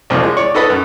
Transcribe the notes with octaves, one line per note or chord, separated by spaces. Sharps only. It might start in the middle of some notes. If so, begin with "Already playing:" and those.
C2 F2 F3
G#3
C#5 D5
D#4 A4 B4 D#6
F#2